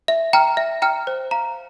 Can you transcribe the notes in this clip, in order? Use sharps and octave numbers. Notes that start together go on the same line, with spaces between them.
E5
G5 A#5 F6
E5
G5 A#5 F6
C5
F5 A#5